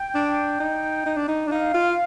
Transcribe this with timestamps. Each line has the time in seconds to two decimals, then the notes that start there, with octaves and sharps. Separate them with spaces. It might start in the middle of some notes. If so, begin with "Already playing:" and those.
Already playing: G5
0.15 D4
0.60 D#4
1.06 D#4
1.17 D4
1.28 D#4
1.47 D4
1.51 D#4 F5
1.74 F4